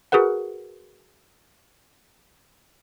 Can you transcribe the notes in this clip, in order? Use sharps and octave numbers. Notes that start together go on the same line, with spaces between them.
F#4 G#4 A#4 B4 F#5